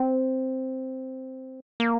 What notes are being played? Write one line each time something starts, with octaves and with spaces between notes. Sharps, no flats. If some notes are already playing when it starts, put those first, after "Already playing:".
Already playing: C4
A#3